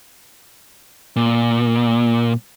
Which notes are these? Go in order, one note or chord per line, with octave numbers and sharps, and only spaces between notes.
A#2